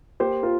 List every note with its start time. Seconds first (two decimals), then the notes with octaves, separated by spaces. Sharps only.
0.20 A#3 G4 C5
0.43 F4 A#4